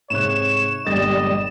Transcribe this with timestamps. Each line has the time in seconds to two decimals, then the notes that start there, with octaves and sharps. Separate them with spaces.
0.10 G#2 C3 C#5 F#6 E7
0.87 G1 A#2 G3 D#5 A6